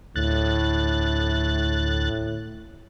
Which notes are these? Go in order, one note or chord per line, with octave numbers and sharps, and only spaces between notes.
D2 A2 F#6 A6